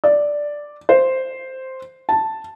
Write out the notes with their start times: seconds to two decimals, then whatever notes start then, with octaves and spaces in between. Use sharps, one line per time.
0.04 D5
0.89 C5
2.09 A5